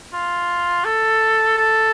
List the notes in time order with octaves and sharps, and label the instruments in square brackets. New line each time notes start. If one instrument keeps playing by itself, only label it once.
[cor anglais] F4
A4
A4